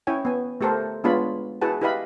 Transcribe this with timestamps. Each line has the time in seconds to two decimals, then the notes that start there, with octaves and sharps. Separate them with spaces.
0.07 C#4 E4 C#5 G5 G#5
0.25 B3 G#5
0.61 A3 G4 A4 A#4 C5
1.04 G#3 B3 D4 F4 C#5 B5
1.62 E4 F#4 G#4 B4 F#5 A5
1.81 E4 G4 B4 D#5 F5 B5